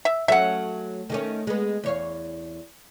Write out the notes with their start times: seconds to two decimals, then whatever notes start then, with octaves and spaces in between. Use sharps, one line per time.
0.05 E5
0.28 F#3 A3 C#4 E5 F#5
1.10 D#3 A3 C#4
1.47 G#3 B3
1.84 E2 C#5 F5